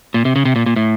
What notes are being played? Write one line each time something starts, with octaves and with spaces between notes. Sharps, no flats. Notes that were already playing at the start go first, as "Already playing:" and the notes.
A#2
C3
C#3
C3
A#2
A#2
A2